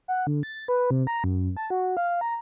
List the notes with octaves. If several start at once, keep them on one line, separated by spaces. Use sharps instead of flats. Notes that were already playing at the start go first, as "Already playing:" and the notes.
F#5
D3
A6
B4
C3
A#5
F#2
A5
F#4
F5
A#5